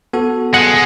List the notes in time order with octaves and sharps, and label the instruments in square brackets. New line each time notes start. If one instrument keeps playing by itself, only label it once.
[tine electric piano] B3 F#4 A4
[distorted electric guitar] G#3 [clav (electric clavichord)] F#5